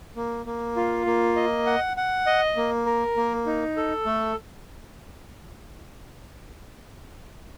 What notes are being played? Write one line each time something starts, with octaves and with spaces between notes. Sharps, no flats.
A#3
A#3
F4
A#3
D#5
F#5
F#5
D#5
A#3
A#4
A#3
D#4
A4
A3